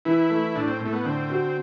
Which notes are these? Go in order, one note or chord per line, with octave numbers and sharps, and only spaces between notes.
E3 E4
A3
A2 D4
C4
A2
A3
B3
D3 C4
F#4